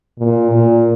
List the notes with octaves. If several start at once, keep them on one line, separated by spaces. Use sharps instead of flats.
A#2
A#2